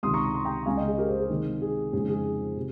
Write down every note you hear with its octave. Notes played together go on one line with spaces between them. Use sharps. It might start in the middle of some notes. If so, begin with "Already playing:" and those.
C#2 C3 D#3 C6 D#6
A#5 C#6
A#5
C6
G5 A#5
C#2 C#3 G#3 F5 G#5
D#5 G5
G#4
G4 A#4
G#4 C5
G#4
C3 D#3 G#3
G#4
F2 C#3 G#3 C4 D#4 G#4
G#4
C3